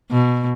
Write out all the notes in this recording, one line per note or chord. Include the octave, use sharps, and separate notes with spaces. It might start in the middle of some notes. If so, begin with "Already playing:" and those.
B2